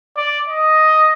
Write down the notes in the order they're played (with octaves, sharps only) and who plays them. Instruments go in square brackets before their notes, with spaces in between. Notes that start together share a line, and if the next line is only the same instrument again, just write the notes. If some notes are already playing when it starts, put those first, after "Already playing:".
[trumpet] D5
D#5